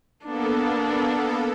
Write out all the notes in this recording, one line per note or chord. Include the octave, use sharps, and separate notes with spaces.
A#3 B3 D4 A4